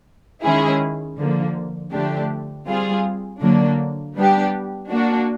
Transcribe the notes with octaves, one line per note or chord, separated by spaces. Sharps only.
D#3 G#3 C#4 E4 G#4
D3 F3 A#3
D3 F3 A3 D4 G4
G3 C4 F4 G#4
D3 F#3 A#3 D4
G3 B3 D4 G4
A#3 D4 F#4